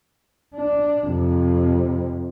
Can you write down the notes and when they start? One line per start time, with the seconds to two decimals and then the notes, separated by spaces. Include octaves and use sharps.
0.55 D4
1.06 F2 C3